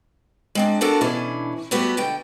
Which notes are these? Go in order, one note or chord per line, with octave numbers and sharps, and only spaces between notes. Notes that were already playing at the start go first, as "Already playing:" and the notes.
G#3 C4 D4
A#3 B3 D4 F#4 A4 A#4
B2 E3 C#4 D4
G3 A3 B3 F#4 G4
B2 D3 G5